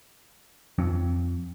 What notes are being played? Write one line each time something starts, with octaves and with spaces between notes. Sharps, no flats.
F2